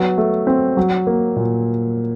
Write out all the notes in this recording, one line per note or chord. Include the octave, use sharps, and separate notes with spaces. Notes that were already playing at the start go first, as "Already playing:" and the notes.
Already playing: F#3 B3
A3
C4
F#3
A#3
A#2